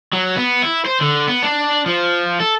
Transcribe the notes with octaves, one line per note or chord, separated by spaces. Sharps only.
F#3
B3
E4
C5
D3
B3
D4
F3
A4